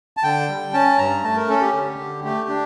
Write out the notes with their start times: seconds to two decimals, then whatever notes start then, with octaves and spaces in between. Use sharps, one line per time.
0.17 A5
0.23 D3 G5
0.49 G3
0.73 C#4 A5
0.98 G2 A#5
1.24 A3 A5
1.36 A#4
1.49 C#4 A4
1.61 G4
1.74 D3
1.99 D3
2.24 A3 G4
2.49 D4